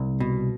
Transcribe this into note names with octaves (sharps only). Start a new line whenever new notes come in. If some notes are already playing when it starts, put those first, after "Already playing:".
Already playing: C2
B2